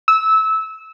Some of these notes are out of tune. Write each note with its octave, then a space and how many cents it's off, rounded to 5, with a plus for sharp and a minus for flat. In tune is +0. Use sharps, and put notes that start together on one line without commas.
E6 -20